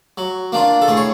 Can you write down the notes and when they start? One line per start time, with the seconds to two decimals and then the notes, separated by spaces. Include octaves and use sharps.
0.18 F#3
0.52 A#3 D4 F4
0.82 A4
0.88 A2 G#4
0.97 C#5